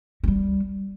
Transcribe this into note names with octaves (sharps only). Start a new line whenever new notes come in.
F#3
G3